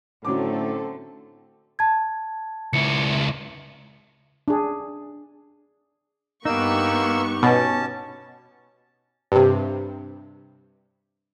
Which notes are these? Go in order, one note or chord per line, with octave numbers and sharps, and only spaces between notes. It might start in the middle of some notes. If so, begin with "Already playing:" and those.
A2 D3 F#3 A3 C4 C#4 A4 D6
A5 G#6
C#2 E4 C#7
D4 G#4
G2 A#3 B3 D#4 G4 C#6 E6
B2 C#4 A5
G2 C3